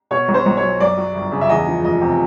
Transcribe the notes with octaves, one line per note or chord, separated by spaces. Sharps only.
B2 C#5
B1
C5
B1
C#5
F#3
F#2 D5
F#3
G1
C#3
E5
E2 D#5
F3
F1 D#5
C3